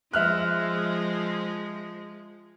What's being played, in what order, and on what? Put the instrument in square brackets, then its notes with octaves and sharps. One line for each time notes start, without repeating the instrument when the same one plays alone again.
[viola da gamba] F3 G#3 [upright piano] E5 F6 F#6